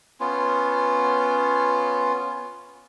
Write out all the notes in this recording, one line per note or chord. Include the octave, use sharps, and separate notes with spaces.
B3 C#4 F4